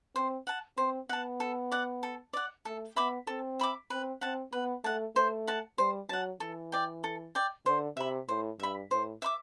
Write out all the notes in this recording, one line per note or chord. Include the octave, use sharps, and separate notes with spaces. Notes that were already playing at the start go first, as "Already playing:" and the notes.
C4 C5
F#5 A5
C4 C5
B3 F#5 A5
A4
D5 F#5
A4
D5 F#5
A3 A4
B3 E5 B5 D6
C4 A4
E5 B5 D6
C4 B4
C4 F#5 A5
B3 B4
A3 F#5 A5
A3 C5
F#5 A5
G3 C5
F#3 F#5 A5
E3 A4
D5 G5
A4
D5 G5
D3 C5
C3 E5 B5
A2 C5
G2 E5 B5
A2 C5
E5 B5 D6